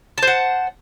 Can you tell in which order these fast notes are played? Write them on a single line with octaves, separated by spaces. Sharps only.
A5 C5 F#5